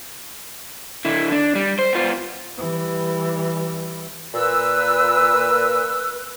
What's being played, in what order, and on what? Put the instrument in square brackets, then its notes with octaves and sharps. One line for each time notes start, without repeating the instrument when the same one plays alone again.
[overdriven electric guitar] D3 E4
D4
G3
C5
B3 F4
[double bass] E3 G3
[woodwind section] A#2 E6 [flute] B4